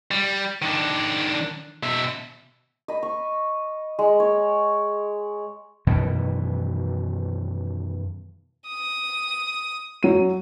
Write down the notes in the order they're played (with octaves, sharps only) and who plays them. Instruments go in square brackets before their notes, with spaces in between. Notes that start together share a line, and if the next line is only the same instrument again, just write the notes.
[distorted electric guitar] G3
D#3 D4
B2 E5
[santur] D#5 B5
C#6
G#3
C#5 B5
[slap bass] F#2 B2 D#3 E3
[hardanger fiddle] D#6
[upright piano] F#3 D#7